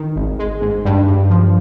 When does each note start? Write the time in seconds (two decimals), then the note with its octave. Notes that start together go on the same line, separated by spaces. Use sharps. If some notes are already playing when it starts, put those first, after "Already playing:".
Already playing: D#3
0.16 G#1
0.39 G#3
0.61 G#2
0.85 G2
1.07 G2
1.30 F3